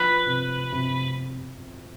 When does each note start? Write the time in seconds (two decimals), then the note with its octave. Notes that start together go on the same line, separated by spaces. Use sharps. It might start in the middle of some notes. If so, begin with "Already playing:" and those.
Already playing: F3 B4
0.26 C3
0.72 C3